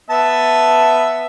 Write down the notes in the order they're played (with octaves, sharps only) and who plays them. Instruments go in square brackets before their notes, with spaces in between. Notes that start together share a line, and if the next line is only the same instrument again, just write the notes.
[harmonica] B3 E5 A5